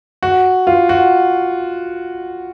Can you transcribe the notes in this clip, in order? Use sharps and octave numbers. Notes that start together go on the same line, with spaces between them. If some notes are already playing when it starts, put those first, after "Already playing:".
F#4
F4
F#4